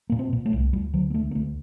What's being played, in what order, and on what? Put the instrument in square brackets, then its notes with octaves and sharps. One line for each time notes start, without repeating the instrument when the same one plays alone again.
[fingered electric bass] A#2 A#3
C4
A#2
A3
C2
D2 G3
D3 F#3
A#3
D3 A3
A#3
D2 A3